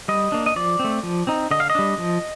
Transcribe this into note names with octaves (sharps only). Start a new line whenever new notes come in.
G3 D#5
A#3 D4
D#5
F3 D5
C4
A3
F3
C4 D#4
D3 D#5
F5
D#5
G3 D4
F3